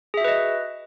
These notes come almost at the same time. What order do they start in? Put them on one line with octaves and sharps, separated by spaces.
G#4 E5 F#4 B4 D#5